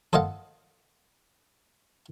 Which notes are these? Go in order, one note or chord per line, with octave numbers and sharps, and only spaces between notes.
A4 C5 D#5 F5 F#5